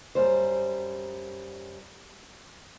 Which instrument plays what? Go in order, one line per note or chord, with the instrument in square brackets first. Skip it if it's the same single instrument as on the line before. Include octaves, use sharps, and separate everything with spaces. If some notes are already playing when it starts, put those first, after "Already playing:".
[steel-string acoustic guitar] F#2 G3 C5